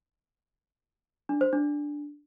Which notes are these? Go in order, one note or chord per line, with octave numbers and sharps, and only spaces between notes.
D4
C5
D4